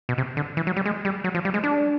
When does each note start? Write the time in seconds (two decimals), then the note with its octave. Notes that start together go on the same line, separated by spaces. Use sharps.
0.09 B2
0.18 C3
0.37 D3
0.57 E3
0.67 F#3
0.76 G3
0.86 G#3
1.05 G3
1.24 F#3
1.35 F3
1.45 G3
1.54 G#3
1.64 D4